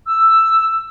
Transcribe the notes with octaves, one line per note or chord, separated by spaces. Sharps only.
E6